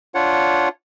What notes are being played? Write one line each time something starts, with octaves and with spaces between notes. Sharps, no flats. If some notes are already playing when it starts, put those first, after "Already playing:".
D4 F4 C#5 F#5